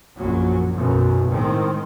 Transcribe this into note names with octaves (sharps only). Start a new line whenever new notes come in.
A#1 F#2 F#3
B1 F#2 B2
A2 D#3 G#3 C4